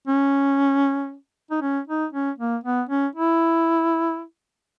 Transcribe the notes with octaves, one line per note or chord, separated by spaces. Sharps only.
C#4
D#4
C#4
D#4
C#4
A#3
B3
C#4
E4